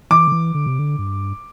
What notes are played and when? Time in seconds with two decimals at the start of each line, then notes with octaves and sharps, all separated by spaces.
0.10 E3 D6
0.27 D3
0.32 E3
0.54 D3
0.66 C3
0.79 D3
0.98 G2